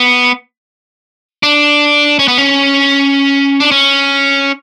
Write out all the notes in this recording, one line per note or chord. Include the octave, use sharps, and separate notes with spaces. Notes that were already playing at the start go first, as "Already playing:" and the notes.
Already playing: B3
D4
C#4
B3
C#4
D4
C#4